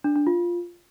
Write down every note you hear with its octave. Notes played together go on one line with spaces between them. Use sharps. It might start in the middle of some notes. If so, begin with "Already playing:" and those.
D4
D4
F4